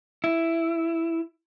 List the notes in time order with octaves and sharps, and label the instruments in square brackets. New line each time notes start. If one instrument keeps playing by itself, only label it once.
[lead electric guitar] E4